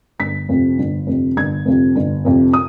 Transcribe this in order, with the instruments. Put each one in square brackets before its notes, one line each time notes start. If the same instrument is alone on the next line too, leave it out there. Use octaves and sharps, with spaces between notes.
[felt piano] G1 B6
F2 C3
G1
F2 C3
G1 G#6
F2 C3
G1
F2 C3
D#6